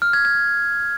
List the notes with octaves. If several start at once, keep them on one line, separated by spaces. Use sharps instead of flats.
F6
G#6
G#6